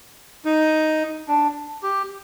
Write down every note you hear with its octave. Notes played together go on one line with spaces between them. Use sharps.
D#4
D4
G4